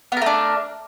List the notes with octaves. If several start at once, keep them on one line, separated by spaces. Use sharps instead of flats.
A3 B3 D4 A#4